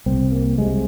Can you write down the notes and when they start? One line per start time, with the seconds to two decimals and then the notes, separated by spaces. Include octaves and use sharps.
0.06 C2 C3 C4
0.32 A#3
0.58 C2 C3 G#3